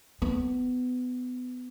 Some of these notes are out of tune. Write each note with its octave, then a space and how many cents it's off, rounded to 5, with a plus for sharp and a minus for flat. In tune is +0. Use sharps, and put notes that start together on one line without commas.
B3 +25